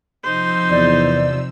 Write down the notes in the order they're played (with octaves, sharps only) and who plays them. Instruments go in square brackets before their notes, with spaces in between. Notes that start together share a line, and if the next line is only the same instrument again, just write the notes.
[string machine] C3 F3 E6 [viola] D#4 C5
[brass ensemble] E2 [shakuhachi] D5